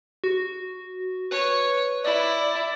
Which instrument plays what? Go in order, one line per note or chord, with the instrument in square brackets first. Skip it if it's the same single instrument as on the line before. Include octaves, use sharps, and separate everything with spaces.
[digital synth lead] F#4
[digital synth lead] B4 [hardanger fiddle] C#5
[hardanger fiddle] E4 [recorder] D5